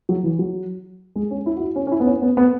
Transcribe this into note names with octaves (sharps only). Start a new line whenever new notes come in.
F#3
E3
F#3
G#3
C#4
E4
F#4
E4
C#4
C#4
E4
B3
C#4
B3
B3